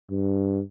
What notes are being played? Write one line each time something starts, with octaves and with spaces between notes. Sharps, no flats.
G2